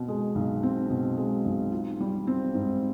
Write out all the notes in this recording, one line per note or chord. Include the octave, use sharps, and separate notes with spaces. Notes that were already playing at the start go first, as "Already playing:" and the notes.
Already playing: B2 C4
G#3
B1
C4
B2
G#3
B1
F4
G3
C4
G#2